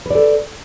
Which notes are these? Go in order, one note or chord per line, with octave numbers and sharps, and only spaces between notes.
A4 B4 D5